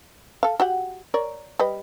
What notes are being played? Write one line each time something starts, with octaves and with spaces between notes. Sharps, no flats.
A4 F5
F#4 G4 F#5
A#4 C#5 D5
G3 B4 D#5